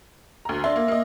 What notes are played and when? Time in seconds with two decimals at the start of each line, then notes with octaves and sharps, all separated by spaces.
0.45 D2 A#5
0.64 D4 E5 C6
0.76 A#3
0.88 A#3 D#5